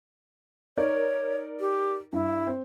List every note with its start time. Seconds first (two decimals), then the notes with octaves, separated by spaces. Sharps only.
0.77 D#4 A#4 C#5 D5
1.60 G4
2.13 G2 E4
2.47 C4